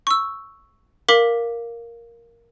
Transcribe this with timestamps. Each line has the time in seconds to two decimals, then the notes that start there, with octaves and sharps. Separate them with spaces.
0.07 C#6 E6
1.09 A#4 F5 D6 B6 F#7